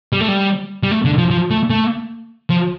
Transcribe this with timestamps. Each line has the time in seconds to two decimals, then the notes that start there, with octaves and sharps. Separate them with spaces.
0.13 G3
0.21 A3
0.28 G3
0.83 G3
0.91 A3
1.05 D3
1.18 F3
1.30 F3
1.50 A3
1.70 A3
2.50 F3